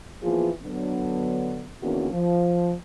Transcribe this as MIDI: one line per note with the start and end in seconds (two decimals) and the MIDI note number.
0.23 0.49 46
0.23 0.49 52
0.23 0.49 53
0.23 0.49 59
0.23 0.49 65
0.23 0.49 68
0.63 1.67 50
0.63 1.67 54
0.63 1.67 59
1.83 2.08 40
1.83 2.08 50
1.83 2.08 51
1.83 2.08 58
1.83 2.08 61
1.83 2.08 66
2.13 2.73 53